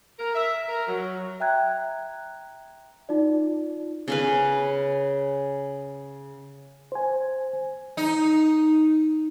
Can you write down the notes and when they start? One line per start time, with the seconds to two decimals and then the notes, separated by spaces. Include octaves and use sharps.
0.19 A#4
0.34 E5
0.68 A#4
0.87 F#3
1.40 E5 G5 A#5 F#6 G#6
3.09 D#4 F4 D5
4.08 C#3 C#4 B4
6.92 C5 G#5
7.97 D#4